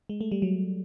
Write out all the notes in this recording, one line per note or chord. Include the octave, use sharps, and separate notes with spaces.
G#3
A3
G3
F#3